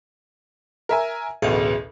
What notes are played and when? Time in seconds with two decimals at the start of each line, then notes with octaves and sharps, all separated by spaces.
0.89 A#4 E5 G#5
1.42 A1 D2 B2 G#4